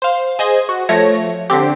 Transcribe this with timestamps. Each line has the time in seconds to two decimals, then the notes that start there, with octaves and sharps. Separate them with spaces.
0.02 C5 F5
0.39 G#4 C5 D#5 G#6
0.69 F#4
0.89 F3 A3 C#5 A#6
1.50 D3 C4 G4